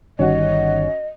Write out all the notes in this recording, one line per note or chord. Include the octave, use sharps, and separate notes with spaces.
G1 D#3 G3 C#4 F#4 D#5